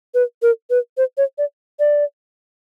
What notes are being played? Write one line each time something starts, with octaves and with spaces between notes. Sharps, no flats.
B4
A#4
B4
C5
C#5
D5
D5